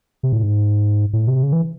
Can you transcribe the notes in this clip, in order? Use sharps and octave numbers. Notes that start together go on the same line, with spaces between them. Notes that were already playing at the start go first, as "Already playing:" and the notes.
C3
A2
G#2
A2
C3
C#3
E3